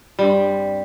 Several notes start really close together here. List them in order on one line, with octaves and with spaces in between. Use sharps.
G3 G2 C4